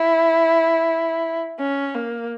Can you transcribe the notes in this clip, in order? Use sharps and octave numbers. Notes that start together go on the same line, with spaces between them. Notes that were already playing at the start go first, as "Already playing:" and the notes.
Already playing: E4
C#4
A#3